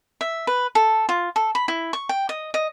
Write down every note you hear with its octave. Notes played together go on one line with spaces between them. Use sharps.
E5
B4
A4
F4
A4
B5
E4
C#6
G5
D#5
D#5